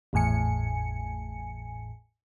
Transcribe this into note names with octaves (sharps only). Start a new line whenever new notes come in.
G#1 E2 A2 G#5 C#7